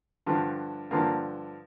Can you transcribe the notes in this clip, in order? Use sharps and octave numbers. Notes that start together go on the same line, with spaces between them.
G2 D3 F3
G2 D3 F3 A#3